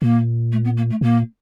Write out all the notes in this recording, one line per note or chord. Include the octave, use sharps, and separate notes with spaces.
A#2 A#3
A3
B3
A#3
A3
A#2 A#3